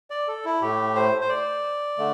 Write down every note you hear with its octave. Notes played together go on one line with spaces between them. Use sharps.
D5
A4
E4
A2 A3 G4
C5
C5
D5
D3 A3